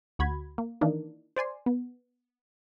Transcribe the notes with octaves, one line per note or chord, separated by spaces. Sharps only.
D2 F#4 B5 G#6
A#3
D#3 E3 A#3 D4 D#4
C5 D5 G#5 C6
B3